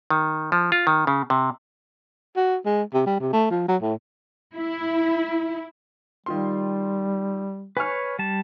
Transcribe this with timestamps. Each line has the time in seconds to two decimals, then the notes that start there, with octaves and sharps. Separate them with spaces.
0.10 D#3
0.52 F3
0.72 F4
0.87 D#3
1.07 C#3
1.30 C3
2.36 F#4
2.65 G#3
2.94 C3
3.06 G3
3.20 C3
3.33 A3
3.51 F3
3.68 F#3
3.82 A2
4.54 E4
6.26 D#3 G3 F4 C6
7.77 B4 C#5 G#5 C#6 F6
8.19 G3 A5